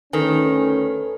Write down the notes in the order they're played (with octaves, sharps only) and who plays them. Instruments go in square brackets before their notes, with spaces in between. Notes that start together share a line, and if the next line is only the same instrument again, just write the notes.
[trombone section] D2 C#4 [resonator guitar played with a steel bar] D#3 [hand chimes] A4 B4 G#5